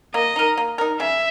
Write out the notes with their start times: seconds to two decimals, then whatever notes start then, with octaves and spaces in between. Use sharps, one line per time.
0.14 A#3 D#5
0.36 D#4 A#4
0.57 A#3
0.78 D#4 A#4
1.00 C#3 E5